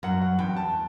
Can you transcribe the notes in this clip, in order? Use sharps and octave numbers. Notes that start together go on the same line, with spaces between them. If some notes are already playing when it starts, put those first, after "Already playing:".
F#2 F#5
F#5
E2 G5
A5